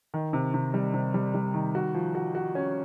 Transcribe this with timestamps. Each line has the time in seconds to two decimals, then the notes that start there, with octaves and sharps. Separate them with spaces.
0.14 D#3
0.33 C3
0.54 C3
0.74 G3
0.94 C3
1.14 G3
1.34 G3
1.54 D#3
1.75 F#4
1.94 F3
2.15 F#4
2.35 F#4
2.55 C#4